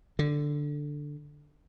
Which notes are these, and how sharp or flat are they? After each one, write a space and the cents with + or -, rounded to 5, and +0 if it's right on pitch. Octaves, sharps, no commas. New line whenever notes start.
D3 +5